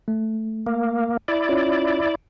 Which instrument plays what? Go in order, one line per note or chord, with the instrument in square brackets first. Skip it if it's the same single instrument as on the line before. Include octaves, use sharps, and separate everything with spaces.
[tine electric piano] A3
[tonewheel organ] A#3
E4 D5
[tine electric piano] C#4 F4 C#5